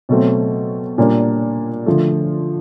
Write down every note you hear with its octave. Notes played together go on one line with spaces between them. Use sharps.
B2 F#3 A3 C4
A#2 G3 A#3 D4
D3 F3 A3